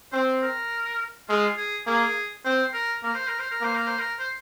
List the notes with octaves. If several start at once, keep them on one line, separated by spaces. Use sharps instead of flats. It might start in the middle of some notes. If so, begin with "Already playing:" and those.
C4 C5
A#4
G#3 F4
G#4
A#3 G#4
C4 C5
A#4
A#3 A#4
C5
A#4
C5
A#4
A#3 C5
A#4
C5
A#4
C5